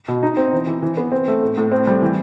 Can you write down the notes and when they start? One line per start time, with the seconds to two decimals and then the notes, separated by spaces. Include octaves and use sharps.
0.08 B2
0.23 D#4
0.37 C4
0.53 E3
0.67 E3
0.82 E3
0.97 B3
1.12 C4
1.28 A3
1.42 A2
1.57 A2
1.72 C4
1.87 G3
2.02 E3